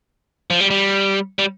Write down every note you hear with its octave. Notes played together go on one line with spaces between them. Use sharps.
F3
G3
G3
G3